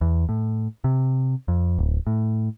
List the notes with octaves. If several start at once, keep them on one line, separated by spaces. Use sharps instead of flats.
E2
A2
C3
F2
D1
A2